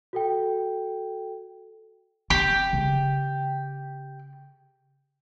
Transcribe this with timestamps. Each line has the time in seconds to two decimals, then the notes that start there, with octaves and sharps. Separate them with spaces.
0.13 F#4 A4 G5
2.30 C4 G4
2.73 C#3